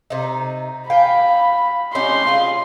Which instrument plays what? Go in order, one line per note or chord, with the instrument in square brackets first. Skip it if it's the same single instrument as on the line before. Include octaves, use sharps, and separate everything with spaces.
[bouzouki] C3 D#4
[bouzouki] F5 G5 G#5 [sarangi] B5
[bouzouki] C#4 D#4 G4 [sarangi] C6
[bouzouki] F4 G#4